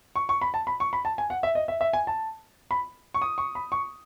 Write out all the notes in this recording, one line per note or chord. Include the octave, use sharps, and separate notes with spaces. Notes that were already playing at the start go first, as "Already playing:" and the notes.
C#6
C#6
B5
A5
B5
C#6
B5
A5
G#5
F#5
E5
D#5
E5
E5
G#5
A5
B5
C#6
D#6
C#6
B5
C#6